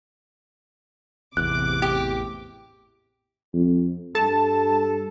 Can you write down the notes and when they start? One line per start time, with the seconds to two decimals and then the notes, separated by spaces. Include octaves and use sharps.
1.37 A1 E2 C3 D6 F#6
1.82 G4
3.53 F2
4.15 G2 A4 A5